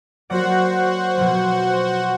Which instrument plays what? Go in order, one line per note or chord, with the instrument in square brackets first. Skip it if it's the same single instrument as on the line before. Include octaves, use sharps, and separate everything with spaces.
[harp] F#3 A#3 D5 [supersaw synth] F#4 C5 F#5
[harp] B2 F3 F#3